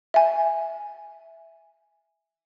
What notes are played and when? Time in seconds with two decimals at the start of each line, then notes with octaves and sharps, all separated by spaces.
0.14 E5 G#5